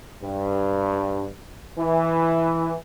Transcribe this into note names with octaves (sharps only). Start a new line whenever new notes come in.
G2
E3